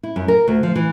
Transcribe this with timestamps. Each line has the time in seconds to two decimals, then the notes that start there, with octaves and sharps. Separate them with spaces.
0.03 E4
0.16 F#2
0.28 A#4
0.47 D2
0.63 F3
0.76 E3